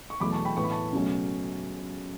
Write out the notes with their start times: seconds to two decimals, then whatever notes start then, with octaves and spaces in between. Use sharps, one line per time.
0.10 C#6
0.20 E2 B2 F#3 A3 B5 D6
0.32 A5 C#6
0.45 G5 B5
0.57 A2 E3 B3 C#6
0.64 B5
0.71 A5 C#6
0.92 C#2 B2 F#3 A3 C#4